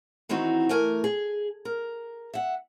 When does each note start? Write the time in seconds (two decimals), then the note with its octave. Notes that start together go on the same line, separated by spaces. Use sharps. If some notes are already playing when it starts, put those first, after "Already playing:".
0.29 D#3 E3 C4 D#4 F#4
0.69 E3 A3 A#4 G#5
1.04 G#4
1.65 A#4
2.33 E5 F#5